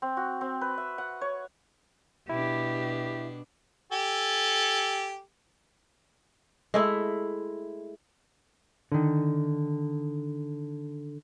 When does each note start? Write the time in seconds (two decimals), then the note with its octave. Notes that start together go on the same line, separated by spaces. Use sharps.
0.02 C4
0.17 F#4
0.41 C4
0.61 B4
0.78 E5
0.98 F#5
1.21 C#5
2.29 B2 D4 E4 G4
3.92 G4 A4 G#5
6.74 G#3 A3 E4
8.92 D3 D#3